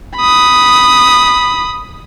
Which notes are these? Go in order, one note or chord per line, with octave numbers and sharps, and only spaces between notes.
B5 D#6